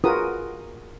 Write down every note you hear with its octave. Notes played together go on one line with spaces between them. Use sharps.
F4 F#4 G#4 A#4 B4 D#6